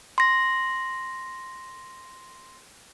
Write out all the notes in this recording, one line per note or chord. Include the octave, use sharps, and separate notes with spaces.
C6 A#6